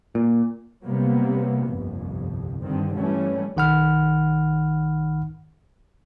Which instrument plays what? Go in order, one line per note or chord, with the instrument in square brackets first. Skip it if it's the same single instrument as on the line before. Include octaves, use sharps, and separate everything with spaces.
[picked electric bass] A#2
[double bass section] C3 F#3 G3 A#3 B3
G1 C2 F2
G2 D3 D#3 C4
G2 E3 G3 A3 C#4
[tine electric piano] B1 D#3 F#5 B5 F6